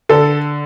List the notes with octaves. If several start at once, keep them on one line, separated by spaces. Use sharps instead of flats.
D3 A4